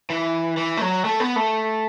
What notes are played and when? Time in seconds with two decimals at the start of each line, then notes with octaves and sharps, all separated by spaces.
0.10 E3
0.57 E3
0.77 A3
0.81 F#3
1.05 A3
1.20 B3
1.36 A3